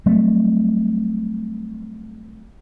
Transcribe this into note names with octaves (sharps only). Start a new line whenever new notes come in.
F#3 G3 A3 C4